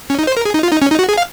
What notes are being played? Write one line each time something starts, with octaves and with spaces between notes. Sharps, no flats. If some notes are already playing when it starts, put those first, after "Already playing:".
C#4
D#4
C5
A#4
G#4
D#4
F4
D#4
C#4
D#4
F#4
G#4
F5